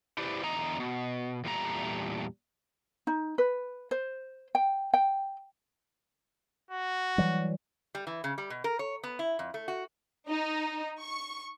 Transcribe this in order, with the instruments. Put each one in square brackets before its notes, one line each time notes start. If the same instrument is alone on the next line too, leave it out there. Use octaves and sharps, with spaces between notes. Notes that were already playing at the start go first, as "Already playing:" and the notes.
[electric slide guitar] E4 G4 B4 C5 D5
E2 D3 D#5 A#5
B2
E2 A#2 G3 A3 F4 A#5
[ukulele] D#4
B4
C5
G5
G5
[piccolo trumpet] F#4
[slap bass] E3 F#3 G3
[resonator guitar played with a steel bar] G3
E3
C#3
G3
B2
A#4
C#5
B3
E4
F2
A3
F#4
[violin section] D#4
C#6